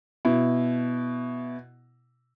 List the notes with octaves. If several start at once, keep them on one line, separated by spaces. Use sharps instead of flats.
B2 E4